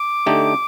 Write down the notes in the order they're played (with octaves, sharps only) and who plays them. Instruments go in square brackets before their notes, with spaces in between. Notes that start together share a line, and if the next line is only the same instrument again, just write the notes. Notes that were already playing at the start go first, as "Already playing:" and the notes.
Already playing: [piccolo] D6
[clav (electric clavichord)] D3 A3 D#4 G4